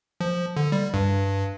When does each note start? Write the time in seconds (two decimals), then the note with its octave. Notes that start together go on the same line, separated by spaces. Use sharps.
0.21 F3
0.57 D3
0.72 G3
0.94 G2